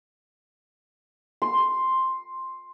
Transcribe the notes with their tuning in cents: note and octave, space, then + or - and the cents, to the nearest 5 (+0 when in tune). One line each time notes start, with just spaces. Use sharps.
C6 +5